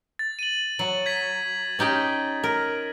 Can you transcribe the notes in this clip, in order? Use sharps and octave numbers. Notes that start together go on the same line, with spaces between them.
A6
D#7 F#7
F#3 F#7
G#6 B6
C#4 D#4 G4
A#4